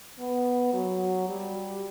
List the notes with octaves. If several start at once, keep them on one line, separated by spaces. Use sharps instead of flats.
B3
F#3
G3